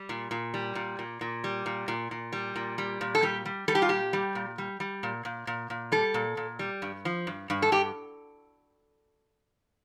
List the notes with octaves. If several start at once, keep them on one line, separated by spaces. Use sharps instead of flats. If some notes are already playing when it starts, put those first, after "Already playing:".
Already playing: G3
A#2
A#2
G3
A#2
A#2
A#2
G3
A#2
A#2
A#2
G3
A#2
G3
A#2
A4
G3 G4
G3
G3 A4
G4
F4
A#2 G4
G3
A#2
G3
G3
A#2
A#2
A#2
A#2
G3 A4
A#2
A#2
G3
G2
F3
G2
G2
A4
G2 G4